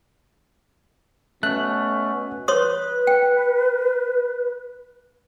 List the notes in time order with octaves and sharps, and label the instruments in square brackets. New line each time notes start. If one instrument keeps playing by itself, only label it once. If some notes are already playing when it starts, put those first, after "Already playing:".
[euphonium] B2 [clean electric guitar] A3 [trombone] C#4 [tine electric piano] F#6
[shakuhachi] B4 [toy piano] C#5 C6 D#6
[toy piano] G5